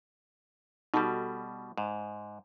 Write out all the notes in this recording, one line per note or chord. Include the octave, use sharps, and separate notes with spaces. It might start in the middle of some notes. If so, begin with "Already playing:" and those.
B2 G3 D#4 F#4 A4
G#2